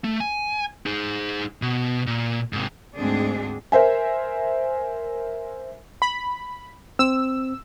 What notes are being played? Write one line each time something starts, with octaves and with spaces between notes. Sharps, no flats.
A3
G#5
D#4 G#4
B2
A#2
G#2 C3
D2 G#2 G#3 C4 D4 G#4
A#4 C5 E5 G#5
B5
C4 E6